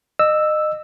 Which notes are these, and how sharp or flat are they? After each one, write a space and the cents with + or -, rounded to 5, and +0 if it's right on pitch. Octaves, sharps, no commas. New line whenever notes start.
D#5 -25 E6 +0